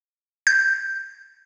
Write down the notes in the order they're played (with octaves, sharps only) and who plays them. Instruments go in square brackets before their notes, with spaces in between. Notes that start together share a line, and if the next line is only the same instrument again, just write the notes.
[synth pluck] G6